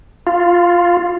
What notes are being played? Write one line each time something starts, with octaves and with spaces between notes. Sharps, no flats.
F4